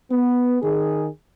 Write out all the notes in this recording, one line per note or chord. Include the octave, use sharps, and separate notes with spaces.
B3
D#3 G#4